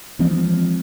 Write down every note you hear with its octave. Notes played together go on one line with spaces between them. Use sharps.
E3 F3 G#3 C4